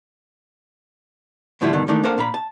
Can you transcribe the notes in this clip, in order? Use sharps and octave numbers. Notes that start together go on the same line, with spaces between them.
A2 D3 F3 G3 E4 F4
G2 B2 D3 D#3
D#3 E3 A3 A#3 D4 D#4
A#3 D4 A4 A#4 C5 F5
A#2 F5 A#5 B5
A5